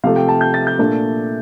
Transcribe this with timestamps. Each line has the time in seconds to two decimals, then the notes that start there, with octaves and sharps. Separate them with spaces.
0.04 C3 F3 A3 F5
0.16 G5
0.29 A5
0.41 G6
0.54 A6
0.67 G6
0.79 A#2 A3 D4